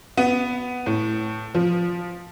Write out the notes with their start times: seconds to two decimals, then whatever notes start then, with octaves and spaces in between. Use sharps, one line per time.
0.17 B3
0.86 A2
1.55 F3